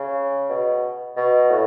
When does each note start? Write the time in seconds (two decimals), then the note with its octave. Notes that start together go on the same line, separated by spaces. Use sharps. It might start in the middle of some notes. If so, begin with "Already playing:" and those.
Already playing: C#3
0.49 B2
1.16 B2
1.50 A2